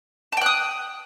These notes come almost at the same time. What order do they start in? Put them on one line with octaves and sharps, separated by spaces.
A5 G5 F#6 D#6